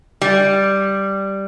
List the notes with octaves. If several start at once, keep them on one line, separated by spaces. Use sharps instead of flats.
G3